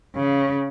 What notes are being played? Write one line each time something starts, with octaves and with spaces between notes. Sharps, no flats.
C#3